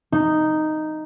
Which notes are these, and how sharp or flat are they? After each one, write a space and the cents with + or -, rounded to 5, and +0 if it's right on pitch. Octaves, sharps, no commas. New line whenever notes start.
D#4 -5